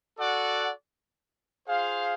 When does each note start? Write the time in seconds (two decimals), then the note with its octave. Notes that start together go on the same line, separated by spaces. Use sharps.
0.18 F#4 A4 D5 F#5
1.67 F4 G#4 C5 F5